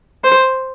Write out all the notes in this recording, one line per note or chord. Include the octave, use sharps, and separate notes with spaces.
C5